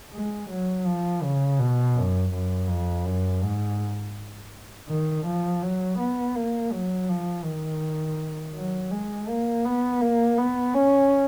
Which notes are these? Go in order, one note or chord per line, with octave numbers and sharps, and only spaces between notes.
G#3
F#3
F3
C#3
B2
F#2
F#2
F2
F#2
G#2
D#3
F3
F#3
B3
A#3
F#3
F3
D#3
F#3
G#3
A#3
B3
A#3
B3
C#4